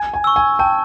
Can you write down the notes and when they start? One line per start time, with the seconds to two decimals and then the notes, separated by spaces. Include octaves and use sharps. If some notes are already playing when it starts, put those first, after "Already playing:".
Already playing: G#5
0.14 G#5
0.24 C#6 E6
0.36 G#5
0.59 G5 A5